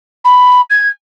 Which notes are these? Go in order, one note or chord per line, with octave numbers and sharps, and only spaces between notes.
B5
G#6